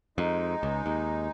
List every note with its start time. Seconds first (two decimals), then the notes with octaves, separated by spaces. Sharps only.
0.18 F2 G#3 D#4
0.63 C#2
0.86 D#2